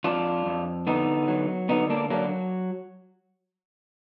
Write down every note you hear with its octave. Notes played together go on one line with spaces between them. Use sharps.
F2 D4 F4
F2
D3 B3 D#4
F#3
D3 B3 D#4
A#3 D4
F#3 A#3 D4